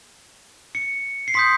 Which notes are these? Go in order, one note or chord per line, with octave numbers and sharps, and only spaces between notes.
C#7
C7
C6 D#6 G6 B6